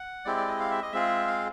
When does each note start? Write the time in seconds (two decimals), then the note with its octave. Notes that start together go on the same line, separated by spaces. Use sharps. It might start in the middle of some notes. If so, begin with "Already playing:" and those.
Already playing: F#5
0.25 G#3 C4 E4 G4 D5
0.37 D5
0.48 D#5
0.60 F5
0.71 E5
0.82 D#5
0.92 G#3 C4 F4 G#4 E5
1.27 F5